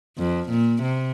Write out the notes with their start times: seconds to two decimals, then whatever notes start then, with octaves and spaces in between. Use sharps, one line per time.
0.18 F2
0.50 A#2
0.83 C3